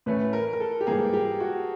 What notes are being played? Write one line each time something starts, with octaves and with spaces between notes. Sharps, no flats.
A2 E3 A3 C#4 B4
A#4
A#4
A4
G4
G#2 E3 G3 A#3 G#4
G4
F#4